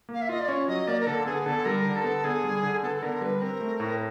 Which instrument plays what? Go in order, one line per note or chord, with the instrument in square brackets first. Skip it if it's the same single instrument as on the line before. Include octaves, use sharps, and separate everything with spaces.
[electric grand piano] A#3 [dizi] F5
[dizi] E5
[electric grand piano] F4 [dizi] D#5
[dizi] D5
[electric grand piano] C#4 [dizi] C#5
[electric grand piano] F#3 [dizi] D#5
[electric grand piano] A#3 [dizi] D5
[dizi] A#4
[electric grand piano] D3 [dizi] A4
[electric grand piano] B3 [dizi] G#4
[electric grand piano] D3 [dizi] A4
[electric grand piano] G3 [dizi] A#4
[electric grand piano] D3
[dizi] A4
[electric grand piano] B3
[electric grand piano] D3 [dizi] G#4
[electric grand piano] G3
D3
[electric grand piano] B3 [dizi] A4
[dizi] A4
[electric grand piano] D3 [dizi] A#4
[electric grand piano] G3 [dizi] B4
[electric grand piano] C4 [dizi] A#4
[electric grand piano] A3
A2